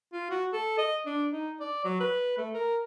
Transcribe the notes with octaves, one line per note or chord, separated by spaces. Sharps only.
F4
F#4
A4
D#5
D4
D#4
D5
F#3
B4
A3
A#4